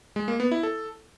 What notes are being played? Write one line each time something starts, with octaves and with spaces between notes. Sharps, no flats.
G#3
A#3
B3
E4
A4